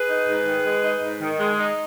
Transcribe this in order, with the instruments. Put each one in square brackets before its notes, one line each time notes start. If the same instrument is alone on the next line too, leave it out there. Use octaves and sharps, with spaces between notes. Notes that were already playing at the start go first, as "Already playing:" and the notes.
Already playing: [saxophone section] G#4 B4
D#4
G#2
D#3
G#3
D#4
G#2
D#3
G#3
D#4